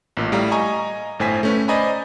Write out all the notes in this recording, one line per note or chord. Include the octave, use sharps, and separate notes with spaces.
A1 A#2
A2 G3 F5 A#5
D#5 G#5 A#5 C#6
G1 A2 C5 G#5 B6
A3 C#4 B4
C5 D5 D#5 G#5 A#5 B5